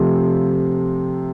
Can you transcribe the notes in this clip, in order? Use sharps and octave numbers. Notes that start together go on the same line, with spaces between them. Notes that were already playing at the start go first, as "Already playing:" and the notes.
Already playing: C3 F3 A3 C4